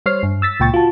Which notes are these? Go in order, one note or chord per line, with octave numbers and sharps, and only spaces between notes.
G3 C5 C#5 F6 C7
G2
E6 A6 B6
C#2 A#2 G5 C#6 A6
F4 F#4 A5